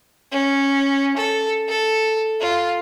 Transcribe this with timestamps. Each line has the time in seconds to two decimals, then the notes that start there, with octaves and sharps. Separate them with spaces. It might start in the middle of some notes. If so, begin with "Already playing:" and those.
0.31 C#4
1.16 A4
1.68 A4
2.40 F4